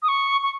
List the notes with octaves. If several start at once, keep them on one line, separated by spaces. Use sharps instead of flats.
D#6
C#6
C#6